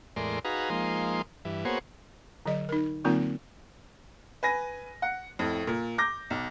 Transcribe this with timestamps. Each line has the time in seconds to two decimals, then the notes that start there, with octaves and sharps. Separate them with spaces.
0.16 E2 A2 G#3 A#4 D5 C6
0.45 D#4 F#4 G#4 B4 F5 A#5
0.70 F3 G#3 A#3 D#4 C6
1.45 G2 E3
1.65 A#3 B3 F#4 G#4 C5 C#5
2.46 D3 F#3 G#4 D#5
2.69 D#4 A#4
3.05 D3 F#3 A#3 C4 D#4 F4
4.43 B4 G#5 A#6
5.02 F#5
5.39 F2 A2
5.67 A#2
5.98 D6 G6 A#6
6.30 B1